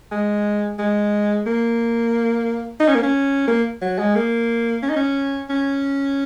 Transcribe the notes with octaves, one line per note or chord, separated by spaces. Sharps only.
G#3
G#3
A#3
D#4
C#4
A#3
C#4
A#3
F#3
G#3
A#3
C#4
D#4
C#4
C#4